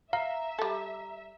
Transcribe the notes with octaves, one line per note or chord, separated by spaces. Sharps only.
E5 F5 A#5
G3 A4